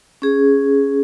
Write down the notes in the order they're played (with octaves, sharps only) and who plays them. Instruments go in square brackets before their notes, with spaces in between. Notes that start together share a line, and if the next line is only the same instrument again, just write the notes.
[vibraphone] C#4 G#4